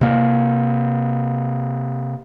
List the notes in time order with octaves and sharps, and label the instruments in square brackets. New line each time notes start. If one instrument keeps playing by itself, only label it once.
[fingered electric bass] C3 A#3